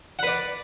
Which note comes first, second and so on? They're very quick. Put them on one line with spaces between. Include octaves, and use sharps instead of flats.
F#5 B4 D5